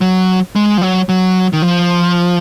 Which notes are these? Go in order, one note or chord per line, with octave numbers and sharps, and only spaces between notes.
F#3
G#3
F3
F#3
F#3
D#3
F3